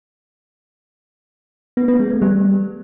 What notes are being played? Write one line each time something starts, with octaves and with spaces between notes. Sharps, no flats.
B3
B3
G#3
A3
G3